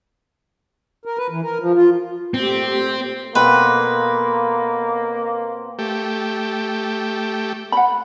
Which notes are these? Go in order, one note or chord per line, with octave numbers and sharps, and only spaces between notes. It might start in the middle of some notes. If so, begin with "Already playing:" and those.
A#4
B4
E3
A#4
F3
F4
A#2 A3 C4 G4
B2 A#3 C4 A4 B4
A3 G4
F#5 B5